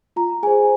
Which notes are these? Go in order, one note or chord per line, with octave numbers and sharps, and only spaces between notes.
F4 A#5
G#4 C5 G#5